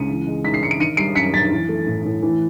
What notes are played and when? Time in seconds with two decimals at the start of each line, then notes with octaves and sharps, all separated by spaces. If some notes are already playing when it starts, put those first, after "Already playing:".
Already playing: C#2 C#7 D#7
0.09 E3
0.27 G#3
0.44 G#2 B6
0.54 C7
0.62 G#2 C#7
0.71 D7
0.79 D#3 C#7 D#7
0.97 G3 C7 D7
1.15 F#2 B6 C#7
1.33 F#2 A6 B6
1.52 E3
1.69 A3
1.87 A2
2.05 A2
2.23 E3